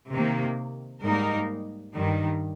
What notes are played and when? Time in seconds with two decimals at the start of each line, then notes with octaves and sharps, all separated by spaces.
0.11 C3 D#3 A#3
1.02 G#2 G3 A#3 D#4 A#4
1.94 G2 D#3 G3